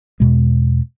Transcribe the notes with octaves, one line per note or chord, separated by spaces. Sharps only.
E2 B2 G#3